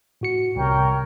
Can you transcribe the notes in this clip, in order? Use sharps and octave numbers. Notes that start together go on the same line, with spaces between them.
A2 F#4 C#7
C2 C3 A#4 C#5 G5